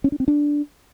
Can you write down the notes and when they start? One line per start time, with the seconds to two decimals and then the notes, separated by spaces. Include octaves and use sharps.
0.04 C#4
0.12 D4
0.20 C4
0.28 D4